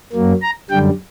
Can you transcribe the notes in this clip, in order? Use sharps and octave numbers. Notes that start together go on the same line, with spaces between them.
F#2 F#3 A#3
A#5
F#2 D3 G3 G5